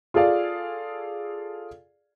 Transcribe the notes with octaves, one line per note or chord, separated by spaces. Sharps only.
F4 G#4 A4 D5 F5